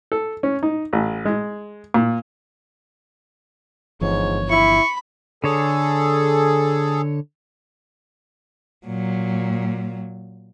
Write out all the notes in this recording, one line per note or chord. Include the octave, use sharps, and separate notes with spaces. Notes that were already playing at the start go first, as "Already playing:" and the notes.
A4
C#4
D#4
A1
G#3
A#2
G1 G#2 E3 F3 C#5
E4 B5 C#6
D3 G#4 A4 C#5
A#2 F#3